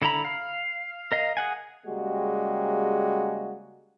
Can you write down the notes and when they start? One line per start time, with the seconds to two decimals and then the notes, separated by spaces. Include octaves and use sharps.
0.02 D3 E4 A4 A#5 B5
0.25 F5
1.12 A#4 D#5 F5
1.37 G#4 F#5 G#5
1.86 C#3 G3 G#3 A#3 F#4 G4